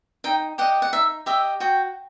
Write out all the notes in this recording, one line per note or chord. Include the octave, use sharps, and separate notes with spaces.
D#4 G5
G4 D#5 F#5
F#5
D#4 E5
G4 D#5 E5
F#4 G5